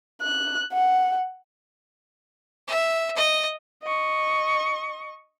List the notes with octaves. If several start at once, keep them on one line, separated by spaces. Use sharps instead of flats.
F#6
F#5
E5
D#5
D#5 C#6